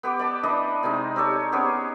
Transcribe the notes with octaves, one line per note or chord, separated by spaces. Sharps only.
B3 G4 D6
D5 G5 A5
E3 D4 D#5 B5
C3 G#3 C4 D#4
C4 G4 A4 C#5
B3 C#4 G4 G#4